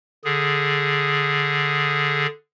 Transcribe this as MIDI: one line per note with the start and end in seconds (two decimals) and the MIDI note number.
0.24 2.26 50
0.24 2.26 68